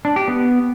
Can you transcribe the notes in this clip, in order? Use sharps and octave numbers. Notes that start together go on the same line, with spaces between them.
D4
G4
B3